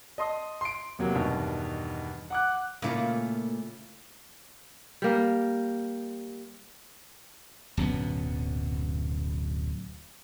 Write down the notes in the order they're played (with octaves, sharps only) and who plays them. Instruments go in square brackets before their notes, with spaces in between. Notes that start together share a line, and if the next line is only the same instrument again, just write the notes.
[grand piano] D#5 A5 C6 D#6
C6 D7
E2 C3 F#3 A#3
E2 G2 B2 D#3
F#5 D6 F#6
[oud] A#2 A3 A#3 [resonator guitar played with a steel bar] C#3 E4 F4
[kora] G3 A#3
[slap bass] D1 F#2 B2 B3